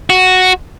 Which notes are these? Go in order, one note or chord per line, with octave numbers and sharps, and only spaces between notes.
F#4